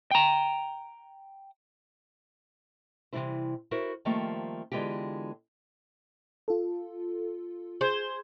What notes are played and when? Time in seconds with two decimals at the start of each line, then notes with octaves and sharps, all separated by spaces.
0.11 G5 A#5
3.13 C3 D#3 E3 G3 E4 C5
3.71 E4 F#4 A#4 C5
4.05 D#3 F3 G3 A3 A#3 C4
4.72 D3 E3 G#3 B3 F4 G4
6.48 F4 A4
7.81 G#4 C5 G#6